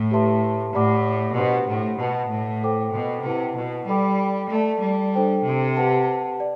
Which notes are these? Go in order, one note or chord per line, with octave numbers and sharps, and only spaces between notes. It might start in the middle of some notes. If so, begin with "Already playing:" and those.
Already playing: A2
G4 B4 E5 A5 C6
A2 G4 D5 F#5 B5 D6
B2 D4 G4 C5 F#5 C6
A2
B2 B4 F#5 A5
A2
A4 C5 G5 D6
B2
C3 E4 B4 F#5 A5
B2
G3 A4 D5 G5 B5 D6
A3 A4 D5 A5
G3
D4 A4 C5 G5
C3
G4 B4 F#5 A5
D5